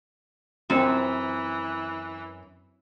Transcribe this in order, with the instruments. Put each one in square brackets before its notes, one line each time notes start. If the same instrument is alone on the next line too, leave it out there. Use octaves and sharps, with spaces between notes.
[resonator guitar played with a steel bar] F#2 [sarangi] E3 [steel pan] C4 F#4